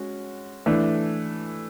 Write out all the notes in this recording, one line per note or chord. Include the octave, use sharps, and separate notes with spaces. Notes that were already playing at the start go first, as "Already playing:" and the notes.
Already playing: G#3 C#4 F#4
E3 A3 D4 A4